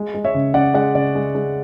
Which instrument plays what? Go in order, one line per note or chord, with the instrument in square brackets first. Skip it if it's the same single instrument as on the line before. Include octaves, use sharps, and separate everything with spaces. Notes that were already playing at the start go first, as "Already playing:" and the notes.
Already playing: [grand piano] G#3
G#3
C#5 E5
C#3
C#3 D5 F#5
G#3 D5 F#5
C#3 D5
G#3
G#3